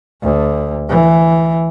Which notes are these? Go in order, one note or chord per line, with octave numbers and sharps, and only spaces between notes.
D2
E3